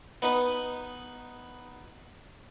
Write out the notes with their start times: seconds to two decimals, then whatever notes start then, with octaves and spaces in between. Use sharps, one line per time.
0.22 B3 D#4 B4